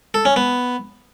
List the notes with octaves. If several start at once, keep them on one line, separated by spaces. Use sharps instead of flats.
A4
C#4
B3